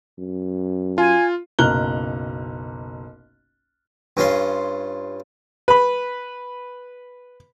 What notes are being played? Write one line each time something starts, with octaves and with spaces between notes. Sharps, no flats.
F#2
F4 G#5
F#1 B1 A#5 F6 F#6 G7
G2 C#4 F4 C6
B4 B5